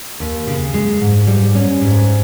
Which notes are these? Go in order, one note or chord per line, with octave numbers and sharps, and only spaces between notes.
D#2
C#3
G#3
G#2
G3
C#4
G#2